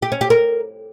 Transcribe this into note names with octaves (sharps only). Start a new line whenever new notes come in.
G4
C#4
G4
A#4